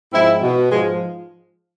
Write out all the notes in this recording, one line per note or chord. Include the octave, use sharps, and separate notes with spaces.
G#2 F3 C4 E4
B2
G#2 F3 G#3